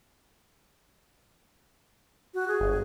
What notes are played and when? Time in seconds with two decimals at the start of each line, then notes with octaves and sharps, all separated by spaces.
2.34 F#4
2.48 G#4
2.60 G1